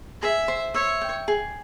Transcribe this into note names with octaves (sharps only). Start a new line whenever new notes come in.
G#4 E5
C5
C#5 E5
G5
G#4